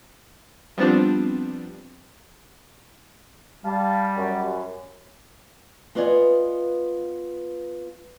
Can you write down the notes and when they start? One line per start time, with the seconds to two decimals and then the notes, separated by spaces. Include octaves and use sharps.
0.78 F3 G3 B3 C4 D4
3.65 G3 F5 A5
4.15 F#2
5.95 B3 F4 B4 D5 D#5 G#5